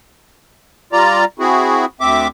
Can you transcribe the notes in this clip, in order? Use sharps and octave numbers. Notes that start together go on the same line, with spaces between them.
G3 F4 D5 A#5
C4 E4 F#4 G#4
D2 C4 E5 D6